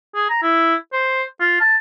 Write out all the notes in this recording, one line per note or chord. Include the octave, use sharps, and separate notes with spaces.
G#4
A#5
E4
C5
F4
A5